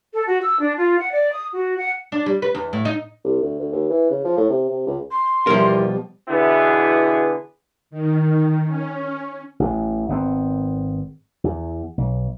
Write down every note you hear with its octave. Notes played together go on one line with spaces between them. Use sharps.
A4
F#4
E6
D4
F4
F#5
D5
D#6
F#4
F#5
D4
G3
B4
E2
A2
D#4
C2
D2
D2
D#2
E3
C#3
F3
A2
C3
C3
C#2
C6
E2 B2 F3 G3 A#4
B2 D3 E3 B3 E4 G#4
D#3
C#4
A1
G#1 B3 C4
E2
B1